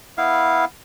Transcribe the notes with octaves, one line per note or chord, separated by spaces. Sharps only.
B3 E4 F5